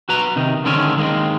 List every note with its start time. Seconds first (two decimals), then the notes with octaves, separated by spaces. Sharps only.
0.09 F#4 B4 A#5
0.36 C3 D#3 D#4
0.65 D3 D#3 G#3 C4 C#4 C#5
0.97 D#3 G#3 A#3 C4